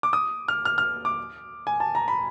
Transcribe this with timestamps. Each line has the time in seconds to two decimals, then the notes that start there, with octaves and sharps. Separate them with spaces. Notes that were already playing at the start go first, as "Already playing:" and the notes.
0.03 D6
0.13 D#6
0.48 F6
0.65 F6
0.78 F6
1.05 D6
1.67 G#5
1.80 A5
1.95 A#5
2.08 B5